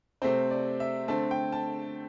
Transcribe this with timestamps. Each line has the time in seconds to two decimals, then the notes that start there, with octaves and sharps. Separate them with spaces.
0.22 C3 A3 C4 C5
0.51 D5
0.80 E5
1.08 D3 A3 C4 A5
1.31 G5
1.52 A5